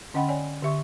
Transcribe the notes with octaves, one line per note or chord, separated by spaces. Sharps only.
D3 C#4 D#5 F#5 G5 B5
C#5 D5 G#5
D3 G4 E5 C#6